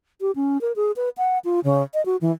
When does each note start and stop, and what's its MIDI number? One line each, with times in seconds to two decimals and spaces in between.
0.21 0.31 67
0.36 0.60 61
0.61 0.72 70
0.76 0.92 68
0.96 1.09 71
1.18 1.39 78
1.45 1.60 65
1.64 1.82 49
1.94 2.04 75
2.06 2.17 66
2.21 2.31 52